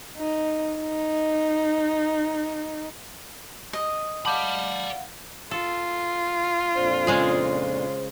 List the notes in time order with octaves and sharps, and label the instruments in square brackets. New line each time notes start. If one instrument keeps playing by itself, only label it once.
[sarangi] D#4
D#4
[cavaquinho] D#5
[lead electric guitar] D5 B5 [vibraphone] F5 F#5 [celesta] A5 D6 G6
[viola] F4 [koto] A4
[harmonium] F2 A#2 D4 [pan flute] C5
[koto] C#3 G#3 G#4